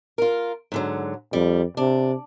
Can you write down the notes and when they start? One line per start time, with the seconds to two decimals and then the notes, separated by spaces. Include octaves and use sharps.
0.18 F4 A#4
0.72 G#2 D3 F#3
1.33 F2 G3
1.77 C3 D4